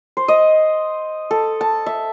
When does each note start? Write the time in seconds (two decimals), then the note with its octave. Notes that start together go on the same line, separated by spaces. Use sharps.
0.17 C5
0.28 D#5
1.31 A4
1.61 A5
1.86 E5